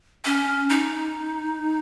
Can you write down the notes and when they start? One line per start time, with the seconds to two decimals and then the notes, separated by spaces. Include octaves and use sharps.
0.25 C#4
0.69 D#4